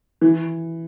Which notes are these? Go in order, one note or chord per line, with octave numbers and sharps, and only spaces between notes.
E3